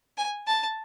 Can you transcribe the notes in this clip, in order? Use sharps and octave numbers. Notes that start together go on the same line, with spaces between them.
G#5
A5